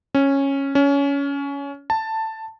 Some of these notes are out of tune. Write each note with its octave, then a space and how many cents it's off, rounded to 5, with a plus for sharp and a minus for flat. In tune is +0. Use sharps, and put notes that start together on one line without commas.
C#4 -10
C#4 +20
A5 +10